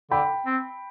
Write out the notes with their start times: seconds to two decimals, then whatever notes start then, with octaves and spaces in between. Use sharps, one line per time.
0.11 D3 G5 B5
0.46 C4